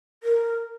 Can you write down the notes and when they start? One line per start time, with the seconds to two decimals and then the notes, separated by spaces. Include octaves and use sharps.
0.23 A#4